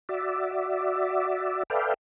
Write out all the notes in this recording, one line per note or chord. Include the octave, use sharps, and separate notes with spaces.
F#4 D5 E5
A4 B4 D5 E5 F5 G5